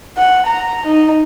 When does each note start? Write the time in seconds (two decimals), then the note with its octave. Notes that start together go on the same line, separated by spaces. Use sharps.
0.17 F#5
0.47 A#5
0.86 D#4